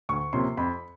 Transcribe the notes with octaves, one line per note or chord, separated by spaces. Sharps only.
D2 C#6
C3 F3 A#3 C#4 C6
F2 B5